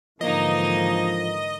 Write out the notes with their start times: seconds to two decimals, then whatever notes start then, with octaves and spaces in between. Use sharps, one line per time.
0.21 G#2 D3 E3 F3 A#3 D#4 D#5